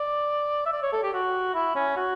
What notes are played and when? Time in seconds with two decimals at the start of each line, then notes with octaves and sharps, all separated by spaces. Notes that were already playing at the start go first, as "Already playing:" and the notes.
Already playing: D5
0.66 E5
0.72 D5
0.82 C#5
0.92 A4
1.03 G4
1.13 F#4
1.54 E4
1.75 C#4
1.96 F#4